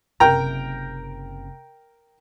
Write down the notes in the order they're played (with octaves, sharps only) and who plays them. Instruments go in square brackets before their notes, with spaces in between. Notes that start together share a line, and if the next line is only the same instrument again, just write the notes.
[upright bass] F#1 C3 [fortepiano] A#4 G5 A#5